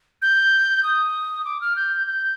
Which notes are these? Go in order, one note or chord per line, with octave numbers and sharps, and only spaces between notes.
G6
D#6
D6
F6
G6
G6